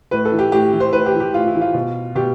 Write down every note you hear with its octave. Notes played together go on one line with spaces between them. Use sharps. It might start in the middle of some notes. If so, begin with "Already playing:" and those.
A2 B4
A4
E3
G4
A2 G4
E3
C5
A2 B4
G4
E3
G4
A2 F4
E4
E3
F4
B2
B2 G4